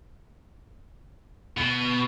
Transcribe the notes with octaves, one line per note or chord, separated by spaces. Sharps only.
B2